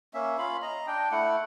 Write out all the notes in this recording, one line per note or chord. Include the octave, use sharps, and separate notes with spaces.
A#3 C#4 E5
C#4 F4 F5 B5
D#5 A#5
D4 G5
A3 E4 F#5